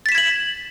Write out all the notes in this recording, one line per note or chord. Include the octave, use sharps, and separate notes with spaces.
G#6 A6 B6 E7 F#7